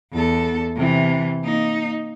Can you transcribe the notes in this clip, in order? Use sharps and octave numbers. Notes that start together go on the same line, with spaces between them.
E2 A4
C3 E3
A#3 D#4